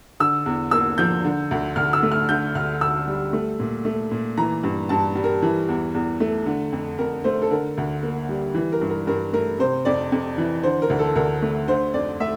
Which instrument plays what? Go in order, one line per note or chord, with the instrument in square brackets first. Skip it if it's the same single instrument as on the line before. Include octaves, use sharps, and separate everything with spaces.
[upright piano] D3 E6
E2
A#3 E6
F3 G6
D3
D2
D2 F6
E6
A3
F6
D3 G6
D2 F6
D2 E6
G3
A3
A#2
A3
A#2
E3 A#5
G2
G2 A5
G3
A#4
E3
E2
E2
A3
D3
F2
F2 A#4
A3 C5
A4
D3 A#4
D2
A#3
G3
E3
A#4
G2
A#4
G2 A#4
A3 A#4
C3 C5
F2 D5
F2
E3
D3 C5
A#4
D2
A4
D2 A#4
A3
D3 C5
F2 D5
A3 E5